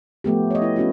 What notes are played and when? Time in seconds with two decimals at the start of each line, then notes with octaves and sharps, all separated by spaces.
0.24 F3 A3 B3 G4
0.51 C#5 D#5
0.62 E4 B4
0.76 B3 C#4 F4 F#4